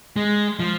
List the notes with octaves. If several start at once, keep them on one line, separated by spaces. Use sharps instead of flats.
G#3
F3